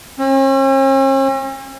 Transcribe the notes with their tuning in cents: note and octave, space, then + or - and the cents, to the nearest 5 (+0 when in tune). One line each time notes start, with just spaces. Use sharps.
C#4 -45